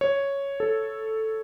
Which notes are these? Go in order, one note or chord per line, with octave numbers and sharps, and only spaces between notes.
C#5
A4